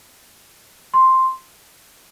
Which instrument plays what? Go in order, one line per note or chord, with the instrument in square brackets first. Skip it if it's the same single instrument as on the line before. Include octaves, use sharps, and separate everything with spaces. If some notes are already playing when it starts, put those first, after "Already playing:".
[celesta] C6